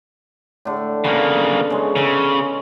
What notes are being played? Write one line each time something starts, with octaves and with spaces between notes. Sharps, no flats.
A2 D3
C#3 A#3 B3
C#3 G#3
C#3 E5 A#5